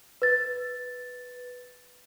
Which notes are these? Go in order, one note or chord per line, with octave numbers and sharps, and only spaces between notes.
B4 A6